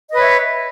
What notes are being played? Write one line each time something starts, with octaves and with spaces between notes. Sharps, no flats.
B4 C#5 D#5 E5